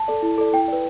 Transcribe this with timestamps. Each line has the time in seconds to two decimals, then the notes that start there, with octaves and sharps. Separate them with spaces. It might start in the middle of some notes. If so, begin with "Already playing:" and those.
Already playing: A5
0.08 A4 D5
0.23 E4
0.38 A4 D5
0.53 E4 G5
0.68 B4 D5